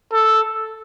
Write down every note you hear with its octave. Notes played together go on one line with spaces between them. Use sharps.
A4